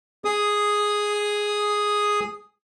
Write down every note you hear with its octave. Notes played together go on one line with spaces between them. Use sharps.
G#4 D#6